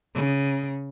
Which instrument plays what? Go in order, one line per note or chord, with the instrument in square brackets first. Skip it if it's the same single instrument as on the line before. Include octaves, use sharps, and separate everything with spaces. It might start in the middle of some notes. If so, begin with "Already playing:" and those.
[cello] C#3